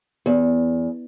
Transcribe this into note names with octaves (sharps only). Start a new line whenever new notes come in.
E2